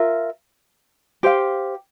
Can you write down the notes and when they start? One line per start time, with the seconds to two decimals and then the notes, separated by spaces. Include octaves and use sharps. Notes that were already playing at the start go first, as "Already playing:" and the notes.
Already playing: F4 A#4 E5
1.23 G4 C5 F5